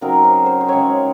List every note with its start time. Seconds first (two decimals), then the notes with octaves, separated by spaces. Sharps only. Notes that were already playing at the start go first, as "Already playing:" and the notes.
0.01 C#3 F#3 C4 D#4 A#4
0.24 C5
0.46 C5
0.61 C5
0.68 C#3 G#3 C4 C#5